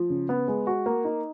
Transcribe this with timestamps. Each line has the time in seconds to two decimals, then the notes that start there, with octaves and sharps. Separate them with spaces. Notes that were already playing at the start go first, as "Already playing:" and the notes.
Already playing: F3
0.10 C#3
0.29 B3
0.48 G#3
0.67 F#4
0.86 A#3
1.05 D#4